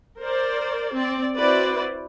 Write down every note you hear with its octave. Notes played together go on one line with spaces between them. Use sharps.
A#4 C5 D5
C4 D5
C4 E4 F#4 B4 C5 D5